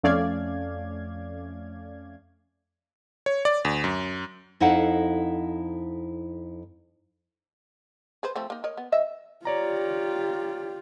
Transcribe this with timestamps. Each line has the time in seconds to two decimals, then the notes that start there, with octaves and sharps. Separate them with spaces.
0.03 F2 A3 C#4 D5 F5 G#6
3.26 C#5
3.45 D5
3.65 D2
3.84 F#2
4.60 F2 D#4 E4 A4 F5 F#5
8.23 G#4 B4 C5
8.36 F3 A3 C4
8.50 A#3 D#4
8.64 A#4 C#5 D#5
8.77 B3
8.92 E3 D#5 E5
9.45 F4 G4 C#5 D5 A#5